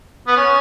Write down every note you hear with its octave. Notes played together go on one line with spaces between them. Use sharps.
B3
C#4